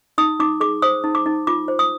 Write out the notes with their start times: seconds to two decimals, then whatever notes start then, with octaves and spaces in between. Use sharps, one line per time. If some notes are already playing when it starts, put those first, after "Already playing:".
0.18 D#4 D#6
0.40 D#4 D6
0.60 G#4 D6
0.82 C5 D#6
1.04 D#4
1.15 D6
1.26 D#4
1.47 F4 D6
1.68 C5
1.79 D#6